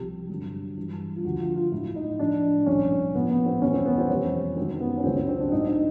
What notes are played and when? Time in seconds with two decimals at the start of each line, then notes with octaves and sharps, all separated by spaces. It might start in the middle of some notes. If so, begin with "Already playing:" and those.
Already playing: C2 C3 F3 G4
0.29 G2 D3 F#3
0.76 G2 E3 G3
1.16 F4
1.24 D2 D3 F3 F#4
1.40 F4
1.56 F4
1.71 A2 F#3 E4
1.95 D#4
2.19 A2 F3 D4
2.66 C2 A#2 F3 C#4
3.14 A2 F3 B3
3.30 B3
3.46 C4
3.61 E2 B2 G3 C#4
3.74 C4
3.86 B3
3.98 C4
4.09 F2 C3 E3 G3 C#4
4.57 F#2 D#3 F#3 C4
4.81 B3
4.97 C#4
5.04 C#2 C#3 F#3 C4
5.16 C4
5.28 C4
5.40 D4
5.52 A2 F#3 D#4
5.68 D#4